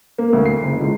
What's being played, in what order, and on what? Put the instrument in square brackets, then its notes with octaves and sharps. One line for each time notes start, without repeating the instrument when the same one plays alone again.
[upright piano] A#3
D2
C7
F#1
C#2